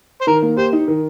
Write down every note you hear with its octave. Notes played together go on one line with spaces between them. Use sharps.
C5
D#3 A#4
A#3
G4 C5
D#4
D#3